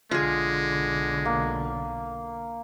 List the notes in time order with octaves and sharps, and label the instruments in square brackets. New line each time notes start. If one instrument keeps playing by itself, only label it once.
[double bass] B1 D3 [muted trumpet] G#3 [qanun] F4 G#4
[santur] A#3